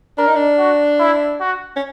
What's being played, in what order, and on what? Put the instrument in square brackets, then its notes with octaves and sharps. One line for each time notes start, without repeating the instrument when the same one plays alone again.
[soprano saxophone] D4 [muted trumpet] A#4
[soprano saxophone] D#4
D4
[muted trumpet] F#4
E4
F#4
[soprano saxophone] C#4